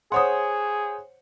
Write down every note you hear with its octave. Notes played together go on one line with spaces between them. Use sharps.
G#4 C5 C#5 F#5 C6 D#6